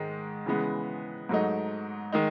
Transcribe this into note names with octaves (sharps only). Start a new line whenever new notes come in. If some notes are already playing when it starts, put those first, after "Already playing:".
Already playing: G#2 D#3 G#3
C#3 E3 G#3 B3
G#2 F#3 A3 D#4
D#3 G#3 D#4